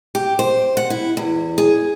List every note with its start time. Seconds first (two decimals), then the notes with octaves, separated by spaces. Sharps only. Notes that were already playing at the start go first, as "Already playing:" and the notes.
0.15 G4
0.39 C5
0.77 F#5
0.90 E4
1.17 E2
1.58 G#4